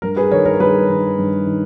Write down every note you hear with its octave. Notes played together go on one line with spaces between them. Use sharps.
G2 A#4
G#4 B4
D#3 A#4 C#5
A#4 C#5
G2 G#4 B4
D#3
G2
D#3